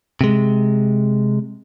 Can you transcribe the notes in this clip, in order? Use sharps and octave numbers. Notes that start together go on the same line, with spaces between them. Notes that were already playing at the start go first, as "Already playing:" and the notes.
C3 G#3